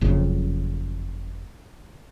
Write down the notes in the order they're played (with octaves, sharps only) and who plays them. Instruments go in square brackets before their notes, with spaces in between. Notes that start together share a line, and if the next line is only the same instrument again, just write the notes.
[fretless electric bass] F#1 F2 C#3